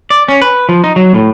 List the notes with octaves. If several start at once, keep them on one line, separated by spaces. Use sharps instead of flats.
D5
C#4
B4
F3
D#4
F#3
A2